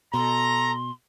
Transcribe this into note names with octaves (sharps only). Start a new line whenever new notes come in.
B2 A4 A#5 C6